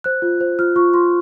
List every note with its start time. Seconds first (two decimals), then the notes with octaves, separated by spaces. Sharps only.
0.04 C5 F#6
0.22 F4
0.41 C5
0.59 F4 F6
0.76 F4 C#6
0.94 F4 C6